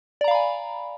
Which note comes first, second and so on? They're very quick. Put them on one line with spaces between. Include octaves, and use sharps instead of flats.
D5 A#5 F5 B5 G#5